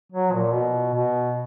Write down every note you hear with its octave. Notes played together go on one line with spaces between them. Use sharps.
F#3
A#2
B2
B2